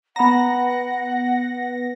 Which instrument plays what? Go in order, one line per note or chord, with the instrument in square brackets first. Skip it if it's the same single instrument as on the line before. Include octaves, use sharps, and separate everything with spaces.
[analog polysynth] B3 A#6 [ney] F#5 [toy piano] A#5 B5